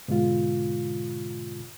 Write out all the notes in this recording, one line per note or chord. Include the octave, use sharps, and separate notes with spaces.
G#2 B2 D3 G#3 F4